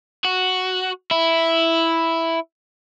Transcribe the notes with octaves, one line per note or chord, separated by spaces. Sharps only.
F#4
E4